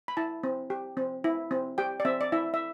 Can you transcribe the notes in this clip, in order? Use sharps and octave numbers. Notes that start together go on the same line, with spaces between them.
B5
E4 A5
C4
G4
C4
E4
C4
G4 G5
D5
C4 E5
D5
E4 E5
E5